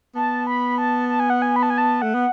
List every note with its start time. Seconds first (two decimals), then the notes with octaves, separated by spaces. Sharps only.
0.15 B3 A5
0.47 B5
0.78 A5
1.09 A5
1.20 G#5
1.30 F#5
1.42 G#5
1.56 B5
1.63 A5
1.70 G#5
1.78 A5
2.02 A3 F#5
2.14 B3